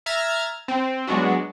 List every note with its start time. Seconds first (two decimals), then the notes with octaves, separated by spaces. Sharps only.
0.06 E5 A#5 F6 G#6 A6
0.68 C4
1.07 F#3 G#3 B3 D4 F#4